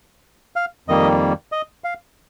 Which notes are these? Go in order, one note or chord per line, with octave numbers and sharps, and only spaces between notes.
F5
F2 D#3 G3 A#3 D#5
D#5
F5